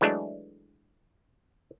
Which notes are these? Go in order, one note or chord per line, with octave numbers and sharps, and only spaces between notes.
E3 F#3 G#3 A3 D4